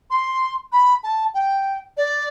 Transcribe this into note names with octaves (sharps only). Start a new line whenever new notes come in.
C6
B5
A5
G5
D5